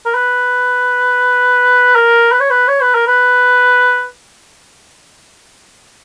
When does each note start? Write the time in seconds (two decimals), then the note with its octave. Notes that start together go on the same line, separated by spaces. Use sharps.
0.06 A#4
0.14 B4
1.96 A#4
2.32 B4
2.41 C#5
2.50 B4
2.68 C#5
2.81 B4
2.95 A#4
3.07 B4